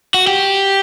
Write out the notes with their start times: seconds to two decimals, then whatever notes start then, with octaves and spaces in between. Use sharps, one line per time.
0.14 F#4
0.27 G4